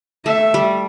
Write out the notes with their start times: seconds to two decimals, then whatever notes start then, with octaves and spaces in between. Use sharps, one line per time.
0.25 A3 E5
0.54 G3